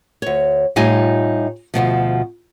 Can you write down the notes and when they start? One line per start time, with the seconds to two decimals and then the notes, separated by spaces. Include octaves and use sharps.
0.22 D2 C#5
0.76 A2 G3 D#4 F4 D#5 G#5
1.74 D2 G2 B2 F3